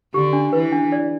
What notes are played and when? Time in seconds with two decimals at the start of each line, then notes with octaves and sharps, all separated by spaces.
0.14 D3 G4
0.33 D4
0.53 E3 B4
0.72 D4
0.92 D5